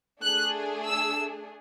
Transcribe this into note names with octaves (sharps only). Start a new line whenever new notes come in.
A3 D4 G#4 F#6
E6